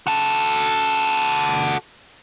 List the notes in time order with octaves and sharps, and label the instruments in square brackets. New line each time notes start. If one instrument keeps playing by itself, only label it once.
[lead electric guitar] F#4 A4